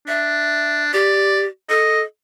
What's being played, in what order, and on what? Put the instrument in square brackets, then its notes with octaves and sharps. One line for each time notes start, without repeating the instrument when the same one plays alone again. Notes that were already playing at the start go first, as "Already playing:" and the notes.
[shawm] D4 [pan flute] E5
[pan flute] G4 [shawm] D5
[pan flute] A4 [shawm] D#5